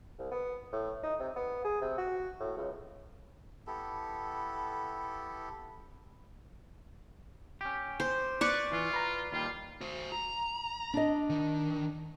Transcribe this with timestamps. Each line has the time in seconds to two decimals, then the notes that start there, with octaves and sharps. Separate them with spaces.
0.18 C2
0.31 B3
0.72 A2
1.03 D#4
1.19 C3
1.36 B3
1.64 G#4
1.81 C3
1.98 F#4
2.40 A2
2.57 C#2
3.67 B3 E4 G4 A4
7.61 C#4 G4
8.00 C5
8.41 B4 D5 C#6
8.72 E3 F4
8.93 B4 A#5
9.33 D#2 G3 F4
9.81 F#4 C5
10.12 A#5
10.94 D4 D#5
11.30 D#3